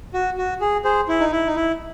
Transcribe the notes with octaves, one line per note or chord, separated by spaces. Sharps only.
F#4
F#4
G#4
G#4 C5
E4
D#4
E4
D#4
E4